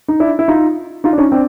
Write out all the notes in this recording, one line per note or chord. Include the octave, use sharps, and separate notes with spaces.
D#4
D4 E4
E4
D#4 F4
D#4 F4
D4
C#4 D#4
C4 D4